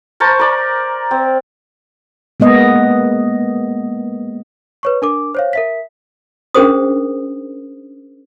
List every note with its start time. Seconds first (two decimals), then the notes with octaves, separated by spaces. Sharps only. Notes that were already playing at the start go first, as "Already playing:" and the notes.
0.20 A#4 C5 A5 C#6
0.39 A#4 D5
1.11 C4
2.40 G#3 A#3 B3 D#5
4.83 B4 C#5 C#6
5.02 D4 A#4 D6
5.35 C5 C#5 F5
5.53 A#4 E5 B6
6.54 C#4 D4 G#4 A#4 C5 D#6